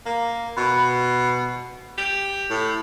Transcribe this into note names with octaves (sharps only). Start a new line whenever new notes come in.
A#3
B2
G4
A2